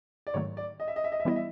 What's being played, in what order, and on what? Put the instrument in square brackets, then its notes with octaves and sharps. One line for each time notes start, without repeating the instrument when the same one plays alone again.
[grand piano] D5
[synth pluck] G#2 D#3 F#3 A3 [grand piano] C#5
[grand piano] D5
D#5
E5
D#5
E5
D#5
E5
[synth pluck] E3 G3 B3 E4 [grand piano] D#5
[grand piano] E5